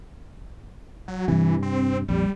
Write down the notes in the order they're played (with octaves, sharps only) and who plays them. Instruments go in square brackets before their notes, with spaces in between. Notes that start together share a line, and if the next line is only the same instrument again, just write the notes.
[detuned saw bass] F#3
[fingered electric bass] G2 C3 [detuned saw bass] E3
[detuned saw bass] C4
[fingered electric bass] A#1 F2 [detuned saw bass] G3